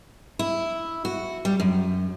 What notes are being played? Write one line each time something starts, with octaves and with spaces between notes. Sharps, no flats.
E4
F#4
G3
F#2